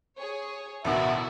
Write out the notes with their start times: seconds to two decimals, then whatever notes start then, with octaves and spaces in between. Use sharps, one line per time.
0.17 G#4 C#5
0.85 A1 D2 B2 E4 F#4 A#4 E5